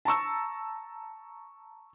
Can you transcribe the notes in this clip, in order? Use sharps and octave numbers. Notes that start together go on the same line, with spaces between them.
A5 A#5 C#6 E6